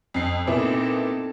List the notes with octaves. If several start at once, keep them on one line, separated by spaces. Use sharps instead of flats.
F2 C7
A#2 B3 C4 D#4 E4 A4